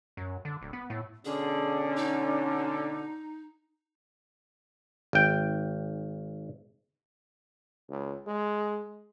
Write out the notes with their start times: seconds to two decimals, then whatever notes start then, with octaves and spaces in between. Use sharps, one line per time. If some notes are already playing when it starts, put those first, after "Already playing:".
0.17 F#2
0.45 D3
0.62 D1
0.73 B3
0.90 A2
1.25 B2 D3 C#4 G#4
1.96 D#4
5.13 G#1 G5
7.89 C#2
8.27 G#3